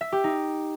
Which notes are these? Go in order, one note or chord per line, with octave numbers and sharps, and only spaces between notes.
E5
G4
D#4